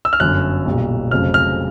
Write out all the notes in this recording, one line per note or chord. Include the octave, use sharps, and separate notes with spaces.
E6
F6
G1 F#2 D3 F#6
B1 A#2 G3
F1 F2 C#3 F#3 F6
F6